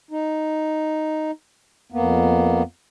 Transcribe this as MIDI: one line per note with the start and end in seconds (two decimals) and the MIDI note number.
0.11 1.31 63
1.92 2.63 41
1.92 2.63 58
1.92 2.63 59